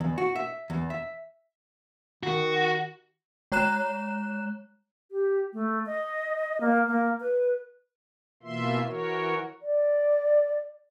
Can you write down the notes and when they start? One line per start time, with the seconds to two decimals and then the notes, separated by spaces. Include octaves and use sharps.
0.01 E2
0.18 F#4
0.36 E5
0.70 E2
0.90 E5
2.23 D#3 F#4
3.52 G#3 C#5 A#5 F#6 E7
5.11 G4
5.53 A3
5.86 D#5
6.61 A#3
6.88 A#3
7.20 B4
8.43 B2 E3 A#3 F4 E5 C6
8.86 E3 F#4 A#4 C#5
9.62 D5